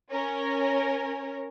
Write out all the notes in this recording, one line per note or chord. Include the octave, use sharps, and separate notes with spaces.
C#4 A#4